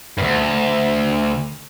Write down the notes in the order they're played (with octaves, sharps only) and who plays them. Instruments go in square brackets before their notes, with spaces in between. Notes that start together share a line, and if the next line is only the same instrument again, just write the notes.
[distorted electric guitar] D2 G2